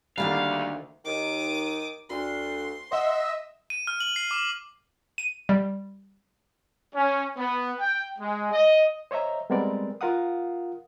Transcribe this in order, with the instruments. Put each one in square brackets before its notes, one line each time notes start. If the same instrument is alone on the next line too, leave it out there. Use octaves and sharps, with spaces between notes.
[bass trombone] D2 [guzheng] D3 D#3 F#5 [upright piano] G3 A#3 [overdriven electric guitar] F5
[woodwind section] D#2 D#3 [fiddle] D6 D#6
[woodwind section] D2 [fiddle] C6
[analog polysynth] D#5 E5 E6 [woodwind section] F#5 C6
[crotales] D#7
F6
F#7
C7
D6
[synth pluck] D#7
G3
[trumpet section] C#4
B3
G5
G#3
D#5
[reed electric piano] C5 C#5 D#5 E5 A#5
G3 G#3 B3 C4 A#4 D5
F4 A#4 F5 F#5 D#6